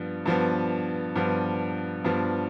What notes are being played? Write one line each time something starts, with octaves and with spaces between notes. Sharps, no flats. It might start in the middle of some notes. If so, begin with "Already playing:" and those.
Already playing: G2 F3 B3
G2 F3 B3
G2 F3 B3
G2 F3 B3